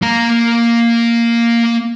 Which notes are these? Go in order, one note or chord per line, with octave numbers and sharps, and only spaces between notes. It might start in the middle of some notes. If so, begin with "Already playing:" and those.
A#3 A#5